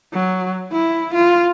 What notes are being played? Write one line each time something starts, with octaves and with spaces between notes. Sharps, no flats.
F#3
E4
F4